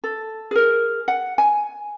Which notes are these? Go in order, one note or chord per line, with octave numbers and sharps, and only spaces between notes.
A4
G#4 A#4
F#5
G#5